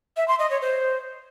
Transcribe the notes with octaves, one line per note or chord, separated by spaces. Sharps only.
E5
C6
D#5
C#5
C5